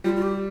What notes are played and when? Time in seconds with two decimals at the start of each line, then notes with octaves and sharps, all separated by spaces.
0.04 G3 F4
0.16 F4
0.22 G4